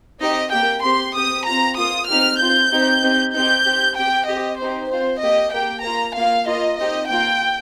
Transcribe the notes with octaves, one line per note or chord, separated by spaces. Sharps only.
C4 D#4 G4 D#5
A#3 G4 G5
C4 G4 C6
C4 G4 D#6
C4 F4 A#5
A#3 F4 D#6
C4 D#4 G4 F6
C4 F4 G6
C4 D#4 G4
C4 D#4 G4
C4 D#4 G4 G6
C4 G4
C4 G4 G5
C4 G4 D#5
C4 D#4 G4 C5
C4 F4 C5
A#3 G4 D#5
A#3 G4 G5
A#3 F4 A#5
A#3 F4 F5
A#3 F4 D#5
C4 D#4 G4 D#5
A#3 F4 G5